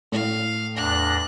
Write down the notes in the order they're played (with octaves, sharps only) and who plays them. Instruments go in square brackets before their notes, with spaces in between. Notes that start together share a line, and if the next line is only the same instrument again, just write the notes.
[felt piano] A2 [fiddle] F5
[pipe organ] E2 D4 A#6 [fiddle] F#6